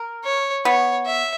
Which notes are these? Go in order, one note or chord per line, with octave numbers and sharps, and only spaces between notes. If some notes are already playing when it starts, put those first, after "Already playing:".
Already playing: A#4
C#5
B3 C#5
E5